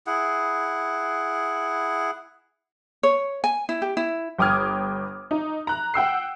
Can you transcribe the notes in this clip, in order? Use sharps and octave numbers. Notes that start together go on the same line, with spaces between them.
E4 G#4 F#5
C#5
G#5
E4
G4
E4
G1 G5 D6 D#6 F6 G#6
D#4
A#5 F#6
F#5 G5 E6 C7